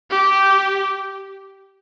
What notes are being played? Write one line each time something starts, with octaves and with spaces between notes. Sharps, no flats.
G4